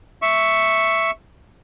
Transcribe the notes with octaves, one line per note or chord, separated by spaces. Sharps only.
E5 C#6